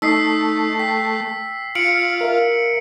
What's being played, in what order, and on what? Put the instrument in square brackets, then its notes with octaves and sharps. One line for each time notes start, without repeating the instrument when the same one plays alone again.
[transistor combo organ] A3 [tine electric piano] D#4 D#5 D#6 [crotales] E6 B6 C7
[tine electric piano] G5 [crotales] B6
[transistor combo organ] F4 [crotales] C#7 D7 F#7
[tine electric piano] A#4 E5 F5